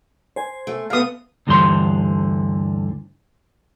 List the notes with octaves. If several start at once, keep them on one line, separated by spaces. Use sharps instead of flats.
C5 G#5
A3
A3 B3 F5 D#6
D2 G2 D3 E3 C5 C6